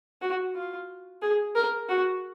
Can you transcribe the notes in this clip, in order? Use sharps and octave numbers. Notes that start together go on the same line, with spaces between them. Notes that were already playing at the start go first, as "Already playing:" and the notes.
F#4
F4
G#4
A#4
F#4